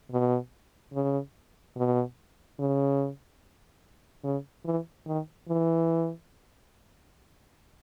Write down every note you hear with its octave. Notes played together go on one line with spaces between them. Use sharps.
B2
C#3
B2
C#3
C#3
E3
D#3
E3